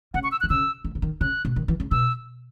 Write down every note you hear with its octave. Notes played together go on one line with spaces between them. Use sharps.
C#3 F#5
C#6
E6
F#6
D#3
C#3 E6
D#3
C#3
D#3
C#3 F#6
B2
D#3
E3
C#3
B2 E6